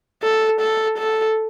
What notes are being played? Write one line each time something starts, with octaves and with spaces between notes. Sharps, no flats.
A4
A4
A4